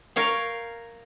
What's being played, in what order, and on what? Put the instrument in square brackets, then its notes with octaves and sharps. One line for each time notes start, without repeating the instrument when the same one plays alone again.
[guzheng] A#4 C#5 F5 G5